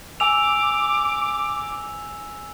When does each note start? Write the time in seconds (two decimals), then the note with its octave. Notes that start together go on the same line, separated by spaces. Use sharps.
0.20 G#5 D6 E6 F7